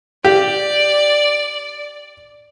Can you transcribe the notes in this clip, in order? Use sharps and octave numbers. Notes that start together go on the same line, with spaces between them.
G4 D5